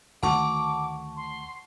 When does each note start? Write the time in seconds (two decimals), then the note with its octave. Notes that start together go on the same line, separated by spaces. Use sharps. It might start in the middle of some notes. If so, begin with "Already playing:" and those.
0.23 D2 D#3 A3 F#5 A5 C#6 D6
1.16 C6